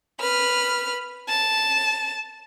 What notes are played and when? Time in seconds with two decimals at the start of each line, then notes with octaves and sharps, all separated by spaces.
0.20 B4 F6
1.29 A5